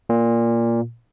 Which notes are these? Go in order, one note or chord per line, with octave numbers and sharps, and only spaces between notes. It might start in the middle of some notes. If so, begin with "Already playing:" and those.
A#2